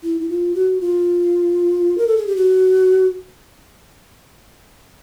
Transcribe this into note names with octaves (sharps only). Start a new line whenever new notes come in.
E4
E4
F4
F#4
F4
A#4
A4
G#4
G4
F#4